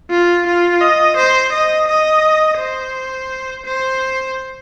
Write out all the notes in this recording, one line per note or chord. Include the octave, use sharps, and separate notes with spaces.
F4
F4
D#5
C5
D#5
D#5
C5
C5